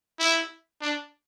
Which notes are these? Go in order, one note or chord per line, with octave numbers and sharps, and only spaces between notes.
E4
D4